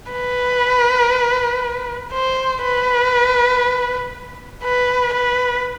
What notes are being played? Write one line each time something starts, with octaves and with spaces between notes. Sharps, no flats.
B4
C5
B4
B4
B4